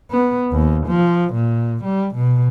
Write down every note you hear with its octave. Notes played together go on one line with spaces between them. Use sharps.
B3
D#2
F3
A#2
G3
B2